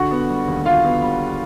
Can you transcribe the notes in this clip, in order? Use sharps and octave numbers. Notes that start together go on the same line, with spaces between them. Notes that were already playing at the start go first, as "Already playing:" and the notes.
Already playing: D3 F#4 F#5
B3
G3
D#2
D3 F4 F5
B3
G3